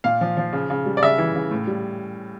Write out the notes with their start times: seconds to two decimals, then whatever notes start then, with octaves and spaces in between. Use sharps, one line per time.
0.04 A#2 F5
0.21 F3
0.37 F3
0.53 C#3
0.70 C#3
0.86 G3
0.97 D5
1.03 C#3 E5
1.18 E3
1.35 C#3
1.51 A2
1.67 G3